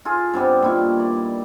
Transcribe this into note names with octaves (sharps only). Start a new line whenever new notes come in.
F4 G#4 A4
G2 C3 G3 B3
A#2 D#3 E4 C#6
D5